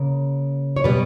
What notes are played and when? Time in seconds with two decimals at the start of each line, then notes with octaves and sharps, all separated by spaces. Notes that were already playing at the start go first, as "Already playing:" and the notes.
Already playing: C#3 A#3
0.76 C#5
0.84 B2 G3 B3 B4